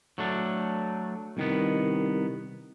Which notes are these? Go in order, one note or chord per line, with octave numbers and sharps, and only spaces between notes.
F#3 A3 D4
C2 D#3 B3